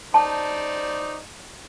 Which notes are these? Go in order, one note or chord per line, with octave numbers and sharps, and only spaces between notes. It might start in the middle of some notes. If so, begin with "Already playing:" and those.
D#4 C5 D5 A5